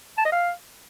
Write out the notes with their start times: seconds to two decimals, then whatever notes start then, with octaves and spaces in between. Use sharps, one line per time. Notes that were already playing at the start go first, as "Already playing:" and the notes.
0.18 A5
0.25 D#5
0.32 F5